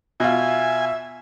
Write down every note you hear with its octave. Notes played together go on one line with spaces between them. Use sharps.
B2 F4 E5 G#5